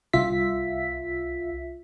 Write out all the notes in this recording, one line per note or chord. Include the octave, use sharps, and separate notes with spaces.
C2 F4 E5 B6